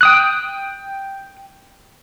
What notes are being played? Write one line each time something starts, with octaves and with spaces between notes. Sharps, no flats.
G5 D#6 F#6